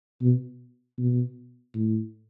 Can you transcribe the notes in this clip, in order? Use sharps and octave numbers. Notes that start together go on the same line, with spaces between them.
B2
B2
A2